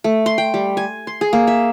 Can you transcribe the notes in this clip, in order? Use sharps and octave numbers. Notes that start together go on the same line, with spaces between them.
A3
C6
G5
G3
G#5
C6
G#4
A#3
E5